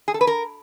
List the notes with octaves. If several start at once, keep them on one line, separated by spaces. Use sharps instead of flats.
G#4
A4
B4
A#4